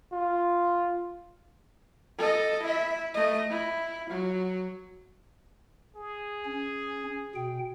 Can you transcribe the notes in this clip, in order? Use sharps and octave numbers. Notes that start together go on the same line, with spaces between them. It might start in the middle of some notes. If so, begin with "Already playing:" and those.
F4
A4 D#5
E4 E5
A3 D#5
E4
F#3
G#4
C#4
B2 G5